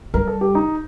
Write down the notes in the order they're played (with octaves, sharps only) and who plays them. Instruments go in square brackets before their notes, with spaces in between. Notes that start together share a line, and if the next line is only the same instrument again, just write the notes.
[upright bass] G3 [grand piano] A#4
[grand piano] A4
G4
D#4